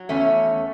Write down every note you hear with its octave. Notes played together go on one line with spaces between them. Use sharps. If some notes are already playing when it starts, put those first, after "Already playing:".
Already playing: F#3
E2 A3 C#4